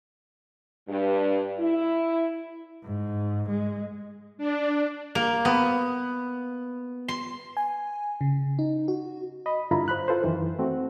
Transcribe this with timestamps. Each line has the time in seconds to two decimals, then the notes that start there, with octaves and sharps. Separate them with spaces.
0.88 G2
1.59 E4
2.84 G#2
3.48 G#3
4.38 D4
5.15 A#3
5.45 B3
7.08 C6
7.57 G#5
8.21 C#3
8.59 D#4
8.88 F#4
9.46 D#5 B5
9.71 G2 D3 E4 F4 A#5 B5
9.88 C5 B5 F#6
10.08 F4 A4 B4 C5
10.24 F#2 D#3 E3
10.59 A3 C4 F#4